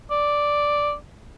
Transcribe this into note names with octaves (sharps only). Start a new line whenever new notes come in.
D5